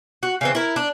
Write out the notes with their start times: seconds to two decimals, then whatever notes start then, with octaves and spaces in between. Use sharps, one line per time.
0.23 F#4
0.41 C#3 E3 C4
0.55 E4 A#4
0.76 D4